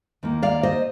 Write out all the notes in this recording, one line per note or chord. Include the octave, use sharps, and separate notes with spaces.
D#2 D#3 A#3
D5 F5
C5 D#5